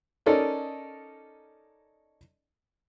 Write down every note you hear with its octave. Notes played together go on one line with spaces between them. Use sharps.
C#4 D#4 A4 A#4 D5 D#5